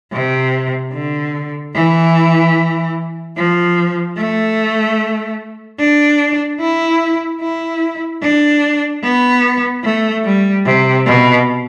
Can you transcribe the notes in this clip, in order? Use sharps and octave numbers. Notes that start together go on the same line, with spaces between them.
C3
D3
E3
F3
A3
D4
E4
E4
D4
B3
A3
G3
C3
B2